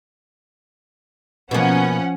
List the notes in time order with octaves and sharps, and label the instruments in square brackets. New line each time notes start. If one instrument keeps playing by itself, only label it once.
[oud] B2 A#3 [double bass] F3 [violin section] C#4 F#5